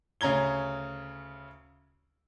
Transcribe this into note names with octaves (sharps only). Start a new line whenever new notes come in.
D2 C#3 C#4 A#5 G#6 G7